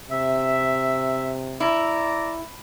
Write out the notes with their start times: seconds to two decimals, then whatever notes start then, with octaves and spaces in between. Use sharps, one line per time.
0.10 C3 E5
1.60 E4 D5 A#5 D6